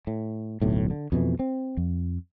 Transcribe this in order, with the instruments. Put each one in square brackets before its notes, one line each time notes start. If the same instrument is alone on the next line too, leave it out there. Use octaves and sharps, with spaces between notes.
[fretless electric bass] A2
D1 B1 A2
D3
F2 B2 D#3 E3
C4
F2